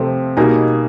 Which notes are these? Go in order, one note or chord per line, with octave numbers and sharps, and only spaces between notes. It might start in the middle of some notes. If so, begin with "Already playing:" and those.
Already playing: C3 F3 A3 C4
B2 G3 A#3 D#4 G#4